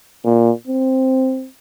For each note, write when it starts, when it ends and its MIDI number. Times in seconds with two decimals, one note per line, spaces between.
0.25 0.52 46
0.67 1.48 60